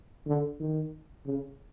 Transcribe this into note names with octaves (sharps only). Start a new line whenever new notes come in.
D3
D#3
C#3